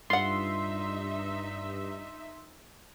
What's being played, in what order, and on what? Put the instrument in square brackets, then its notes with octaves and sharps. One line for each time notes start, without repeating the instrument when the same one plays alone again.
[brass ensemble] G2 [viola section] D#4 E5 [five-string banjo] F4 F#5 [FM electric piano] C6